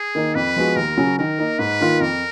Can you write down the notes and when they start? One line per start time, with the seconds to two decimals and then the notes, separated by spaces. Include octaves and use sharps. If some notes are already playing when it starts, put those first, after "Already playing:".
Already playing: G#4
0.15 D#3 A#3 D#4 A#4
0.35 F2 B4
0.56 F3 G#3 B3 F#4
0.76 D#2 A#4
0.97 C#3 F#3 C#4
1.19 D#3 A#4
1.39 A#3 D#4
1.59 G#2 B4
1.81 D#3 A#3 F4
2.00 F2 A#4